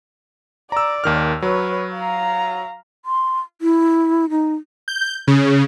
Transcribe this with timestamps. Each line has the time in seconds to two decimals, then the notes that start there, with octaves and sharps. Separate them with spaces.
0.72 D5 A#5 E6
1.04 D#2 D#3 F6
1.42 F#3 B4 C#5
1.94 F5 A#5
3.05 C6
3.62 E4
4.30 D#4
4.88 G6
5.27 C#3